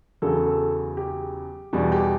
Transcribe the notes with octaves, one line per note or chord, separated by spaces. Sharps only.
E2 C#3 F#3 A4
A4
G4
E2 B2 G3
G4